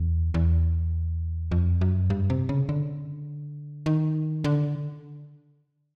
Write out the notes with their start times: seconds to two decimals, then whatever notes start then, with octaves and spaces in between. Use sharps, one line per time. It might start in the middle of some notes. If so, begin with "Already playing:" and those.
Already playing: E2
0.34 E2
1.51 F2
1.81 F#2
2.10 G2
2.30 C3
2.49 C#3
2.69 D3
3.86 D#3
4.44 D3